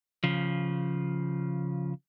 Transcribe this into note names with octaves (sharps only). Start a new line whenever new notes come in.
C#3 F3